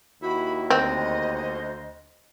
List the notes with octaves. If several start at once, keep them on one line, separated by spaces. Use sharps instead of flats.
D#2 E4 F#4 B5
D2 C4 C5 D#5